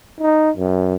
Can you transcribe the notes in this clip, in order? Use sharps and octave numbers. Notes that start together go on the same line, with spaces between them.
D#4
F#2